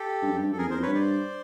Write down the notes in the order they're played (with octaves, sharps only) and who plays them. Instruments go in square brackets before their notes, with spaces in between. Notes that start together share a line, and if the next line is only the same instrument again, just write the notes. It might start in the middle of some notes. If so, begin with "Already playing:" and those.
Already playing: [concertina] G4 A4
[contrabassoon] G2
F#2
G2
[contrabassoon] F#2 [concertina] A4
[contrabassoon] F2 [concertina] G#4 A#4
[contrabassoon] E2
[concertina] A#4 C5
[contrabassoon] F2
[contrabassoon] G2 [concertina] B4 C#5
[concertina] C5 D5